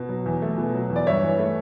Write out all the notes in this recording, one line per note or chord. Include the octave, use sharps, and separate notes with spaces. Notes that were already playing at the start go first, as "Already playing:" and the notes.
Already playing: B2
F#3
E2
A3
B2
F#3
E2
D5
G2 C#5 E5
E3
A3